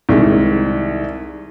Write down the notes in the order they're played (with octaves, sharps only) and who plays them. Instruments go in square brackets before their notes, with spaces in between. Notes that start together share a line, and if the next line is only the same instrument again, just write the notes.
[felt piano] C2 D#3 G#3